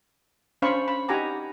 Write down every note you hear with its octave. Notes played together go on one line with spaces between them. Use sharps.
C#4 D4 C5 F5 B5 C#6
B5
D#4 G4 F#5 G#5 A#5 D6